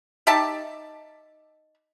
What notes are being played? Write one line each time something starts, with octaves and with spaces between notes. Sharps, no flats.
D#4 G4 E5 A5